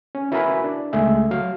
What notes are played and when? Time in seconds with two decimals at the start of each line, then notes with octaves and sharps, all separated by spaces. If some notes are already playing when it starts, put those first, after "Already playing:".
0.15 C#4
0.32 E4 F#4 A#4 B4 G#5 B5
0.64 D4
0.93 C#2 G#3 A3 G#4 E5
1.31 F#3 F5